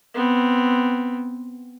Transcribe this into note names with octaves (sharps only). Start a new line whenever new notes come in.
B3 C4